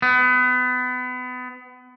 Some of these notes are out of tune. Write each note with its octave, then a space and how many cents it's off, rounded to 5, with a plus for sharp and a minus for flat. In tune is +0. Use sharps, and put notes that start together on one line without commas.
B3 +30